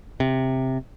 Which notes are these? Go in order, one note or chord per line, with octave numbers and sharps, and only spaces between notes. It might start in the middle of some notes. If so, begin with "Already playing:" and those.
C3